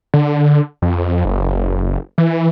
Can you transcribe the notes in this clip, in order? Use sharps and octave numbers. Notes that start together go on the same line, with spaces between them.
D3
F2
F#1
E3